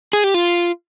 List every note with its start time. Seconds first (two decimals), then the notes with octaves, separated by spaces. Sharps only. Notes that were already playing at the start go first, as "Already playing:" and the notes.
0.13 G#4
0.24 G4
0.34 F4